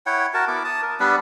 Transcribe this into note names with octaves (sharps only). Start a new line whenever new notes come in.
E4 C#5 F#5 G5
F#4 A#4 A5
B3 E4 D6
A5 D#6
A#4
G3 B3 D4 B4